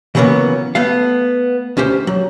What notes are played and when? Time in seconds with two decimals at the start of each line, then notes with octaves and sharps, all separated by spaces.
0.15 C#3 E3 F#3 A#3 B3 C#4
0.75 A3 B3 F5
1.77 D2 C#4 G4 C5
2.07 F#3